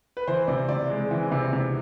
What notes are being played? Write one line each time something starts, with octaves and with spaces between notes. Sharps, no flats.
B4
E3 C5
C3 D5
C3 D5
G#3
E3
C3
C3